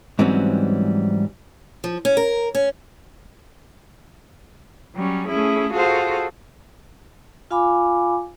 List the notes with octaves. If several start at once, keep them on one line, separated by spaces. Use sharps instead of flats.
G#2 E3 F#3 G3 C4 C#4
F3
C#4
A#4
C#4
F#3 G3 C#4
A3 C#4 E4 G#4
F4 F#4 G#4 A4 C5
F4 F5 G#5 B5 D6